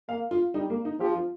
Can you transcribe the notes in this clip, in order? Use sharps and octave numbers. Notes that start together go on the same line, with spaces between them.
A#3 F5
F4
G3 D#4
A#3
D#4
F3 G4
F4